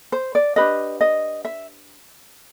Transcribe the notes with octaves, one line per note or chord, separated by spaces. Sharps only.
C5
D5
D4 G4 B4 D#5
D#5
E5